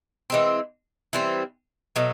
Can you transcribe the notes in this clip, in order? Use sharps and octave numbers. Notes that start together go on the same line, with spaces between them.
E3 G#3 C4
E3 G3 C4
B2 F#3 A3